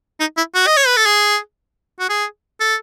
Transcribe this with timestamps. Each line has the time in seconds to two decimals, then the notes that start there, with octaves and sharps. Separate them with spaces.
0.20 D#4
0.37 E4
0.55 F#4
0.67 D#5
0.77 C#5
0.87 B4
0.97 A4
1.06 G#4
2.00 F#4
2.09 G#4
2.60 A4